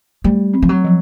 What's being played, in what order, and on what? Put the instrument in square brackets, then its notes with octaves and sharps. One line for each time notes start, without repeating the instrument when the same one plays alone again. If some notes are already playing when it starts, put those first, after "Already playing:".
[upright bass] G3 [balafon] A3
[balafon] C4
[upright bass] F3
F#3
[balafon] F3